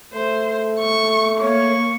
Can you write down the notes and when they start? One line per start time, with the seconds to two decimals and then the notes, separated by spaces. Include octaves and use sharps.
0.13 A3 C5
0.79 C#6
1.40 A#3 C#5 C#6